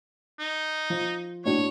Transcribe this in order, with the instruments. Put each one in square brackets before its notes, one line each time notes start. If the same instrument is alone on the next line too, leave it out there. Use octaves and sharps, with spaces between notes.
[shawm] D#4
[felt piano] F3
[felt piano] A2 D4 F#4 [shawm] C#5